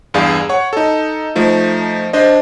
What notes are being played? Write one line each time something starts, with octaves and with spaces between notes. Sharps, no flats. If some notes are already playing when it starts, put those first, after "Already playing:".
E2 G2 G#4 D5 F5
C#5 F#5 C#6
D#4 A4
F3 A3 D#4
D4 C5 D#5